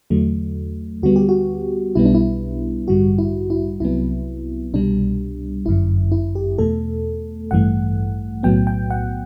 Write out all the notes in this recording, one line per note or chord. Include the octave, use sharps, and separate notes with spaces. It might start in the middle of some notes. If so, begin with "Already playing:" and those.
E2 D3 F#3 A3
D2 D3 G3 B3 F#4
G4
F#4
B1 B2 G3 B3 E4
D4
E4
A1 G2 D3 G3 F#4
E4
E4
C2 C3 F#3 B3 E4
C2 B2 G3 D4
G1 F#2 D3 E4
E4
G4
E2 B2 A3 A4
A1 G2 E3 A3 F#5
B1 A2 F#3 B3 G5
G5
F#5